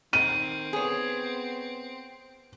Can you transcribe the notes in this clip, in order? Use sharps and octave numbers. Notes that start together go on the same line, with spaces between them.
D#3 C4 D#7
B3 G#4 C#5